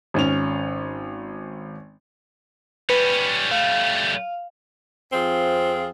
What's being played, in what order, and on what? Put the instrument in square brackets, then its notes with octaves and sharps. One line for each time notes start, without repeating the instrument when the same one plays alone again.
[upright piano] G#1 C#4 F7
[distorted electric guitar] G3 C#4 [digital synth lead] B4
[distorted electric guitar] G3 A3 [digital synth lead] F5
[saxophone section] F2 F3 C4 F4 G#4